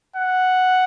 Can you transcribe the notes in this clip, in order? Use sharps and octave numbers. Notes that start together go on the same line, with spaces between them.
F#5